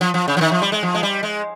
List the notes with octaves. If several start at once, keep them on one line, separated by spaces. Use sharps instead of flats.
F3
F3
C#3
F3
D#3
F3
G3
G#3
F3
G#3
G3
G#3